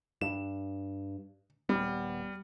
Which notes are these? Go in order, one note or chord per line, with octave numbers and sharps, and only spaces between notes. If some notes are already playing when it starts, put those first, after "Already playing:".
G2 E7
D#1 G3 B3